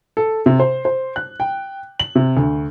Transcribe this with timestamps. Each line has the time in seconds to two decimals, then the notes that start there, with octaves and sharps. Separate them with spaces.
0.17 A4
0.46 C3
0.60 C5
0.85 C5
1.16 F#6
1.40 G5
2.00 F#7
2.15 C3
2.37 D2